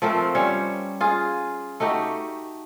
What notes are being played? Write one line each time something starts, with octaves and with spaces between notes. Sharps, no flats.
F3 A3 C4 A#4
G3 C#4 C5 C#5
F4 G#4
A3 D#4 F#4 G4